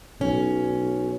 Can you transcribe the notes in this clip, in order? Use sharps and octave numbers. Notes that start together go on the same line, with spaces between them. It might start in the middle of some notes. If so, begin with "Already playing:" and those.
B1 C#4